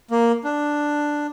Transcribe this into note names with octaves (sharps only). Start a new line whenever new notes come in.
A#3
D4